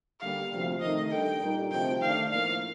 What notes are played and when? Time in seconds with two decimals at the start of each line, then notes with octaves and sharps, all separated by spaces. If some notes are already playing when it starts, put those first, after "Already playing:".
0.19 D3 G3 A#3 F5
0.50 D2 C3 F3 C4
0.80 C3 D#3 A3 D#4 D#5
1.10 G3 D4 A4 G5
1.40 A#2 G3 A#3 D#4
1.70 D2 C3 F3 C4 F4 G5
2.01 D#3 A3 D4 F5
2.31 A2 F3 A#3 F5